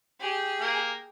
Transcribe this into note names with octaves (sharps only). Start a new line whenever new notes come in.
G4 G#4
A#3